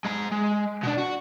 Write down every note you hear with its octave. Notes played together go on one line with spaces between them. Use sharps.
G#3 A#5
G#3
B2 D4
F#4